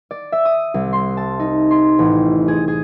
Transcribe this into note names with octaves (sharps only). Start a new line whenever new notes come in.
D5
E5
D#6
C2
C6
A5
D#4
C6
A1
G#4
G#4